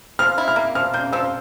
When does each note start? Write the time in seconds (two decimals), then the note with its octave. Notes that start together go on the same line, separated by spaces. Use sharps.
0.19 F3 F6
0.38 E4
0.48 F6
0.56 A#3
0.75 F3 F6
0.93 A#3 G6
1.13 F3 E6